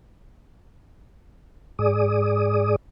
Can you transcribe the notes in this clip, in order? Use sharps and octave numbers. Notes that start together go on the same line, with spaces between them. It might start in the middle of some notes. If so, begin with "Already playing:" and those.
G#2 G#4 D5 D#6